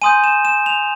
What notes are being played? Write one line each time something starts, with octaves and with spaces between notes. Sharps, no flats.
G#5 C6 D#6 G6 D#7
E7
E7
F7